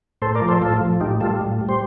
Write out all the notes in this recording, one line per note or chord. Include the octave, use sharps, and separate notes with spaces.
A2 A4 C5
A#4 D5
F3
A4 C5
A2 F4 A4
F3
A2 D#4 G4
G3 F4 A4
A2
G3
C5